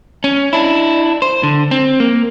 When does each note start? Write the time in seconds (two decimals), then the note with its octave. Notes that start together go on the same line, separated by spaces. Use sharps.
0.24 C#4
0.53 D4 E4
1.22 C5
1.43 D3
1.71 C4
2.00 A#3